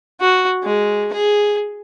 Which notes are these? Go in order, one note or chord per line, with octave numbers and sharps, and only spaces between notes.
F#4
G#3
G#4